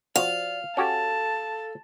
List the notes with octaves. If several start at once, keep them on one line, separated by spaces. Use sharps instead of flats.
F3 F#4 D5 F5
C#4 F#4 G4 A4 A5